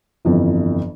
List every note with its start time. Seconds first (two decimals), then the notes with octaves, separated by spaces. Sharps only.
0.25 G1 F2 E3